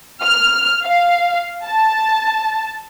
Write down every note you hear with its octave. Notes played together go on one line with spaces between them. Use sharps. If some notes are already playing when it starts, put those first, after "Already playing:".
F6
F5
A5